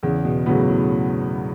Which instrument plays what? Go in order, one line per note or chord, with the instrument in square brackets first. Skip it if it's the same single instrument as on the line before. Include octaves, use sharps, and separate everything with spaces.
[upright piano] E2 [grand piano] C#3
[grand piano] B2
[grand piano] A2 [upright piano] C#3 F#3 B3
[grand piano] A2